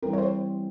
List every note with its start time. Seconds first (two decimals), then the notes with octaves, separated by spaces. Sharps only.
0.02 E3 G3 C4 A#4
0.13 C#5
0.18 C5